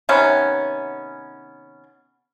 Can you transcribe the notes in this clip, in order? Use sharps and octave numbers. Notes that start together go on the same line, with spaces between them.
C3 D#3 B3 C#4